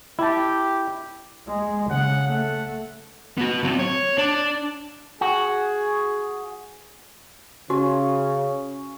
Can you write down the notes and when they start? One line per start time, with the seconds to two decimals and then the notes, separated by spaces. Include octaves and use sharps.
0.19 E4 G4 A5
1.48 G#3
1.91 C#3 F#5
2.27 A3 F#5
3.38 B3 F#4
3.63 F#3 C4
3.79 C#5
4.18 D4
5.21 F#4 G#4
7.70 C#3 C#4 F#4